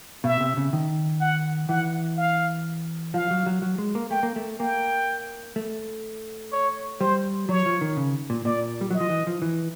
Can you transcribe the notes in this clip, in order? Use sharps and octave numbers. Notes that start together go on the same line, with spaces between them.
B2 E5
C3
C#3
D#3
F#5
E3 F#5
F5
F3 F5
F#3
F#3
F#3
G#3
A#3
A3 G5
A#3
A3
A#3 G5
A3
C#5
G3 C5
F#3 C#5
F3
D#3
C#3
A#2
A#2 D5
G3
F#3 D#5
F3
E3
F3
E3